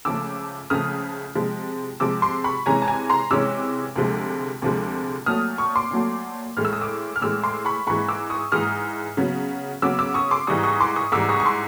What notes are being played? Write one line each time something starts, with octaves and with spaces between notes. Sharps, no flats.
C#2 C#3 F3 A3 D6 E6
C#2 C#3 F3 A3 D#6 F6
C3 F3 G#3
C3 F3 G#3 D6 E6
C6 D6
B5 C#6
C3 E3 G#3 C#4 G#5 A#5
A5
G#5 A#5
A#5 C6
C3 E3 G#3 C#4 D6 E6
D2 C3 F3 G#3
D2 C3 F3 G#3
A#2 F#3 A3 D#6 F6
C#6 D#6
C6 D6
A#2 F#3 A3
A2 E3 G#3 F6
E6
D#6
D6 E6
F6
A2 E3 G#3 D6 E6
C6 D6
B5 C#6
G#2 E3 G#3 B5 C#6
D6 E6
C#6 D#6
G#2 E3 G#3 D#6 F6
C#3 F#3 B3
C#3 F#3 B3 D6 E6
D6 E6
C#6 D#6
C6 D6
G#2 E3 G3 C#6 D#6
C#6 D#6
C6 D6
C#6 D#6
G#2 E3 G3 D6 E6
C#6 D#6
C#6
C6 D6